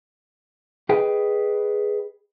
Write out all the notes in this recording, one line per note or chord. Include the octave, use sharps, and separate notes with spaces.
G4 G#4 B4 D#5 G5